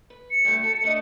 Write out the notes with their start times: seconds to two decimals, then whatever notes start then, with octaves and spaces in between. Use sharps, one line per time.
0.10 B4
0.31 C#7
0.45 G2 B2 A3
0.64 A4
0.84 A3 D4 D#5